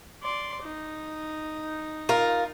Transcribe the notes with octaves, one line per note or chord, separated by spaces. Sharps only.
D5 C6
D#4
F4 A#4